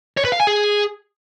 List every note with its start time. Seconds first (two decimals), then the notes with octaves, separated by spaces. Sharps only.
0.17 C#5
0.25 B4
0.32 F5
0.40 G#5
0.47 G#4